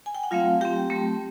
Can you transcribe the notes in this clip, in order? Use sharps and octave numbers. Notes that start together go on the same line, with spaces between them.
G#5
G5
F#5
F#3 A3 C4 F4 F5
F#3 A3 C4 G4 G5
F#3 A3 C4